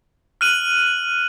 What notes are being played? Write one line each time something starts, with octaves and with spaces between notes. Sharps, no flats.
F6 F#6 D#7 F#7